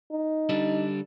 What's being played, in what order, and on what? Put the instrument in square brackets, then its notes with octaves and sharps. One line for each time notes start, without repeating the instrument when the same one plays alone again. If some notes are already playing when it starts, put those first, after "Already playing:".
[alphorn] D#4
[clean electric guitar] D3 G3 D4